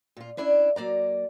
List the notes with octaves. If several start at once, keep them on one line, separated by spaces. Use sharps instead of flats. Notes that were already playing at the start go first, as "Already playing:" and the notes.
A#2 F4
C#4 D4 E4 D5
F#3 A#3 D5 A#5